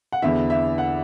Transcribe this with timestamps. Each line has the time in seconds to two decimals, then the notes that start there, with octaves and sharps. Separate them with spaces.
0.12 F#5
0.22 E2 D3 B3 E5
0.50 E5
0.78 F#5